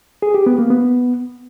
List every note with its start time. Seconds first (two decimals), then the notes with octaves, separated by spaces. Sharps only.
0.22 G#4
0.34 G4
0.46 B3
0.58 A#3
0.70 B3